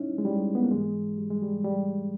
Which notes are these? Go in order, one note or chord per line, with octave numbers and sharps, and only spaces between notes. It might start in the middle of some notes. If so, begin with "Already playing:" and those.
Already playing: A#2 G3 C#4 D#4 E4
G#3
G3
B3
A#3
G#2 E3 G#3
G3
G#3
G3
G3